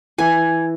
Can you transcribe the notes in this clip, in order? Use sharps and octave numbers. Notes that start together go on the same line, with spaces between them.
E3 G#5